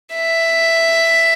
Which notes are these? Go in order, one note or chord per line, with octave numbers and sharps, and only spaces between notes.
E5